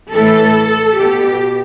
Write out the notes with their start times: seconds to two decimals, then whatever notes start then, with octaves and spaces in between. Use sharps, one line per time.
0.12 A2 E3 A4
0.97 B2 G4